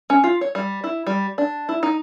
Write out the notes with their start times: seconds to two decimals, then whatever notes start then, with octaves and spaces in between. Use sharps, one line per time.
0.10 C#4
0.24 F4
0.41 C#5
0.55 G3
0.84 E4
1.07 G3
1.38 D4
1.69 E4
1.83 D#4